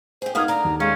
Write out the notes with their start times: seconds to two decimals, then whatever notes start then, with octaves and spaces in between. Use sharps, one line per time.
0.22 G4 G#4 C5
0.35 A#3 B3 D#4 F5 D#6 F6 G#6
0.48 D3 D4 A#5
0.64 D#2
0.80 G#3 C#4 F5